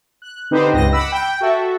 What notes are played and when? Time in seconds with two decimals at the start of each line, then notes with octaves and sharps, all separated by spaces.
0.22 F#6
0.51 D3 C4 D#4 G4 B4 C5
0.74 C#2 G2 D#5 A#6
0.92 F#5 B5 D6 E6
1.12 G5
1.41 F#4 A4 E5